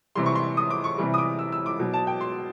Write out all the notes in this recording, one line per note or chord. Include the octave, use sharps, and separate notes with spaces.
C3 E3 G3 C6
C#6
C6
D#6
D6
C#6
C3 E3 G3
D#6
D6
E6
E6
D6
B2 F#3
A5
G5
C6